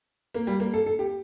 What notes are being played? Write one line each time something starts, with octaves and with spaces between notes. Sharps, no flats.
A#3
G3
A#3
A4
A4
G4